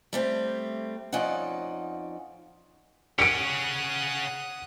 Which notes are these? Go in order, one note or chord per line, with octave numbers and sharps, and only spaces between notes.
G3 A3 C4
F2 C#4 D#4 D5 F#5
C#3 C#4 F#5 D#6 C#7 D7